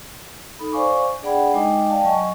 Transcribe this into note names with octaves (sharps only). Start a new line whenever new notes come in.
D#4 A4 B5
C5 D5 F5 G#5 C#6 D6
D4 G#4 D5 F#5 G5 B5
G#3 D#4 D#5 G5 G#5 D6
D5 F5 G5 A5
F#3 D#5 G#5 C#6